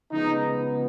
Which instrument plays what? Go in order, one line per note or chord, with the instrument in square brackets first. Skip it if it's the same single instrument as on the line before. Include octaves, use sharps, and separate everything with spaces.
[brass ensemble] C#3 F3 G#3 B3 D#4